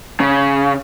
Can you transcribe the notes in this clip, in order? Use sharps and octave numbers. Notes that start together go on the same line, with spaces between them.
C#3